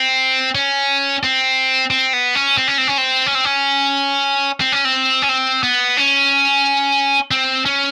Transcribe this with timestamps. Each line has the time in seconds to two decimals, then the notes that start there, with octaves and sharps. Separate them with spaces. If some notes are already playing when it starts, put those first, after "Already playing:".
Already playing: C4
0.55 C#4
1.23 C4
1.90 C4
2.13 B3
2.35 C#4
2.58 C4
2.68 C#4
2.78 C4
2.87 C#4
2.98 C4
3.26 C#4
3.35 C4
3.45 C#4
4.60 C4
4.72 C#4
4.85 C4
5.22 C#4
5.29 C4
5.63 B3
5.97 C#4
7.31 C4
7.66 C#4